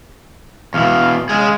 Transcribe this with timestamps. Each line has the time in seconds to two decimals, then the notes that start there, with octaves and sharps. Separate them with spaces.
0.74 E2 B2 F5
1.29 G#3 G#4 F5